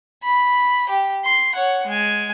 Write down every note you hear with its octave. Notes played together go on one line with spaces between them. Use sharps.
B5
G4
C6
C#5 F#5
G#3 G#5